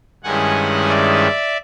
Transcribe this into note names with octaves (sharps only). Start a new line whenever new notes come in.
G2 D#3 G#3 C#4 E4 F#5 G#5
D5 E5